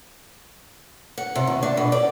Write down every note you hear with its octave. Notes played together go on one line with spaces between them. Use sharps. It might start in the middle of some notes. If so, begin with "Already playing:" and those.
F#5
C3
D#2
D4
B2
D5